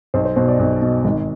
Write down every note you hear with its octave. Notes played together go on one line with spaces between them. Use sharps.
B1 C5
C5
B2 C5
D5
B1
B2
G#1